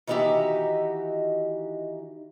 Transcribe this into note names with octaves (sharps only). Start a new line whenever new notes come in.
D#3 E3 D#4 F#4 G4 E5